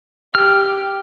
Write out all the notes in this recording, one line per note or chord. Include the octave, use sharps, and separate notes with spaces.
G4 F6